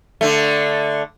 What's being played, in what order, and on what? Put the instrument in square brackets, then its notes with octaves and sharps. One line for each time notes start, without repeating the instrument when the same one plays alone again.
[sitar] D3 A3